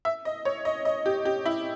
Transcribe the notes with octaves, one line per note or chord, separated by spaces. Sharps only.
E5
D#5
C#5
D#5
D#5
G4
G4
E4